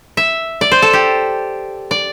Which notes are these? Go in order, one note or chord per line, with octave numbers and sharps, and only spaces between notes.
E5
D5
C5
A4
G4
D5